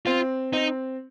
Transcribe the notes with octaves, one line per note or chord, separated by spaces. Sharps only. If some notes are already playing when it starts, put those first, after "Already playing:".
C4 F4
C4 D#4